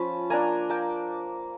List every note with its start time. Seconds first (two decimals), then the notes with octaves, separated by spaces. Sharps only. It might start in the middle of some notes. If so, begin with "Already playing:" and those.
Already playing: F3 C#4 A5 B5
0.30 A#3 D4 G#5 A#5
0.69 A#3 G5 A5